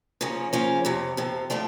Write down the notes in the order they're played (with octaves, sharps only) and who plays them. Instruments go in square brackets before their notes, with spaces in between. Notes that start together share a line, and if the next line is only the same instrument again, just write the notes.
[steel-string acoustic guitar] C#3 F3 A#3 C#4
C#3 F3 A#3 C#4
F2 C3 F3
F2 C3 F3
A2 F3 A3 D4 F4